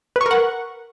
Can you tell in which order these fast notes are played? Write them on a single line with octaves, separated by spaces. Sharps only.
B4 C#6 A#4 F#5